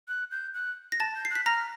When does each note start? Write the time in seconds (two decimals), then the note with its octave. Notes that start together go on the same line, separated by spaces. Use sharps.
0.08 F#6
0.31 G6
0.54 F#6
0.92 A#6
1.00 A5 A6
1.16 G6
1.25 C7
1.30 F#6
1.35 B6
1.46 A#5 F6 A#6